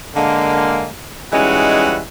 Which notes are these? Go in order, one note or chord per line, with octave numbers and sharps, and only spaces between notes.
D3 G#3 A#3
E3 G3 G#3 C#4 D#4 F#4